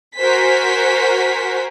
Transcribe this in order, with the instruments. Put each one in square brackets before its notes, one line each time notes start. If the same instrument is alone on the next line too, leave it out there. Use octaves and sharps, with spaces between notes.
[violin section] F#4 A#4 C5 G#5 B6